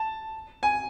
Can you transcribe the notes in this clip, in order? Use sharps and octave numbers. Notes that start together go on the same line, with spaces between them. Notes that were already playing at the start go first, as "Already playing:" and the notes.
Already playing: A5
G#5